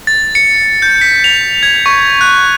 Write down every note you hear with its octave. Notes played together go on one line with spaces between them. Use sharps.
A6
C#7
G6
B6
F7
G#6
C#6
F#6